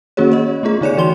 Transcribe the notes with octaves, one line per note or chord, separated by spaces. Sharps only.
D#3 A#3 C#4 F#4 G#4 C#5
C#5 D#5
A3 B3 F4 G#4
D3 D#4 C#5 D5 C#7
E3 F#4 C6 G7